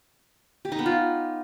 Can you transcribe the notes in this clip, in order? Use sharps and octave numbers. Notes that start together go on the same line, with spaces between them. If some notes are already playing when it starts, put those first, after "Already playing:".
G4
D#4
B3
F4